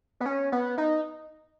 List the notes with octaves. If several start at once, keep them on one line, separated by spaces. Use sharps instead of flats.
B3
C#4
B3
D#4